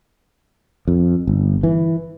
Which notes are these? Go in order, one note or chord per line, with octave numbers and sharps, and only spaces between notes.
F2
G1
E3